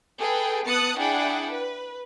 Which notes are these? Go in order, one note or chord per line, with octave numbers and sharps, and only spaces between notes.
G#4 A4 B4 G5
B3 A5 D#6 F#6 C#7
D4 E4 G#4 F#5 G5
B4